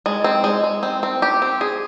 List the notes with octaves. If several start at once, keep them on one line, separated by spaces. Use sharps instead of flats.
G#3
C4
G#3
G#3
C4
C4
G4
C4
G#4